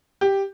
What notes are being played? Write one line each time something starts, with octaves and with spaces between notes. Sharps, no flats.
G4